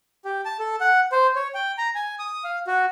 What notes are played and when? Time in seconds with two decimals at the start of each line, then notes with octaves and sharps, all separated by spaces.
0.25 G4
0.45 A5
0.60 A4
0.81 F#5
1.12 C5
1.36 C#5
1.54 G5
1.78 A#5
1.95 G#5
2.19 D#6
2.44 F5
2.67 F#4